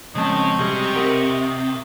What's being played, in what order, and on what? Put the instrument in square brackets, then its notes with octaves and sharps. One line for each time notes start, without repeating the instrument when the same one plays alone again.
[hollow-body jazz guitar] F2 G#3 A5 [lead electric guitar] C#3 [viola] C4 C#6 [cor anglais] D#5
[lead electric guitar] C3 [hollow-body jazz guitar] G3 G#4
[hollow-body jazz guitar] G4 A#4 F#5